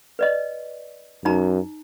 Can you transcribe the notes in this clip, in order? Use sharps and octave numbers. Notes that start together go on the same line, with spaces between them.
B4 D5 D#5
F#2 D#4 A#5